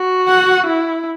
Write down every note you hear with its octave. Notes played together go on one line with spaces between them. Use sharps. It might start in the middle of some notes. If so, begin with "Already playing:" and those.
Already playing: F#4
F#5
E4